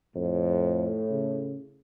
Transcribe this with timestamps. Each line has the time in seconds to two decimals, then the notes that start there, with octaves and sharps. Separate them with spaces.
0.15 F2 A2
1.11 C#3